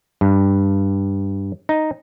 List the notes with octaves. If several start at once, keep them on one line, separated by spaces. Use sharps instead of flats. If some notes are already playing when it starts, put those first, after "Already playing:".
G2
D#4